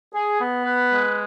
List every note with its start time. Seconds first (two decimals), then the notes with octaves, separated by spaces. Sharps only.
0.14 G#4
0.39 B3
0.64 B4
0.90 G#3